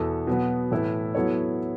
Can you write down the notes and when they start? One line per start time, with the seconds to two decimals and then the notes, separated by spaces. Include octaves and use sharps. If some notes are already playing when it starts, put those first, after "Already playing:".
Already playing: E2 B2 B3 A4
0.27 B2 F#3 B3
0.71 A2 E3 A3 E4 B4
1.15 F#3 B3 E4 A4 C#5